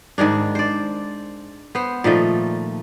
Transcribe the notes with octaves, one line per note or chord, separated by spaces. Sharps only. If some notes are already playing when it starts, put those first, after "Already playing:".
G#2 D#3 G#3 D4
C5 D5
B3 C5
A#2 D#3 F3 A3